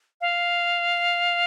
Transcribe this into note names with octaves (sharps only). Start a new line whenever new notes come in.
F5